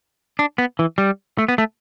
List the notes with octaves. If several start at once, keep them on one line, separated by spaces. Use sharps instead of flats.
D4
B3
E3
G3
A3
B3
A3